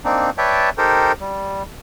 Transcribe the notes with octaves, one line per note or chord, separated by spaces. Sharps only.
A#3 C4 D4 D#4
B4 C#5 D5 E5 G5 A5
D#4 G4 A4 A#4 C5 G5
G3